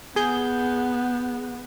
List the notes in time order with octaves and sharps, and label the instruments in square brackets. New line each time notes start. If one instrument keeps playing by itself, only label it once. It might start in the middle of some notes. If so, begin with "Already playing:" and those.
[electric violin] B3 [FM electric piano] G#4 G6